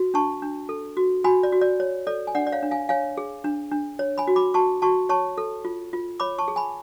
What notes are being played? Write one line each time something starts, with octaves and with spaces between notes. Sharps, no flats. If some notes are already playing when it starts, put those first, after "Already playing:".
Already playing: F#4
D4 A5 C#6
D4
A4
F#4
F#4 G#5 B5
D5
F#4
D5
C#5
A4 D5
G#5
D4 D5 F#5
D5
C#5 F5
D4
F5 G#5
C#5 F5 G#5
G#4
D4
D4
C#5
G#5 B5
F#4
B5 D6
F#4 A5 C#6
F#4 A5 C#6
C#5 A5 C#6
A4
F4
F4
C#5 B5 D6
A5 C#6
G#4
G#5 B5